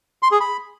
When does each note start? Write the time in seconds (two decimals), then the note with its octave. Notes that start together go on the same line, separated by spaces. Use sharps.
0.23 C6
0.32 G#4
0.40 B5